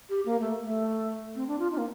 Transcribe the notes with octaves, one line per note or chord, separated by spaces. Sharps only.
G4
A#3
A3
A3
C4
D4
F4
D#4
A#3